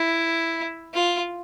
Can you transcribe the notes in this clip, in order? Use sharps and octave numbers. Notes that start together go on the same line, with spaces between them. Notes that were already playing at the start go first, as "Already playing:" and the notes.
Already playing: E4
F4